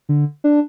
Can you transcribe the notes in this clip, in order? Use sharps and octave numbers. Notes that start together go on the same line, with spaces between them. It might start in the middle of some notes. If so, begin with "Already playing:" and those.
D3
D4